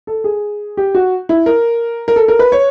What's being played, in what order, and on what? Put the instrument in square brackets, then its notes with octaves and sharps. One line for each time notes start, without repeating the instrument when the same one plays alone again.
[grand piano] A4
G#4
G4
F#4
E4
A#4
A#4
A4
A#4
B4
C#5